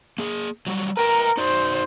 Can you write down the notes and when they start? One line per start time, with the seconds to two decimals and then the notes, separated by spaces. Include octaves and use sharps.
0.18 A#3 G#4
0.67 F#3 G3 F#4
0.97 A#4 B4 G5 A#5
1.37 D#4 F#4 C5 D5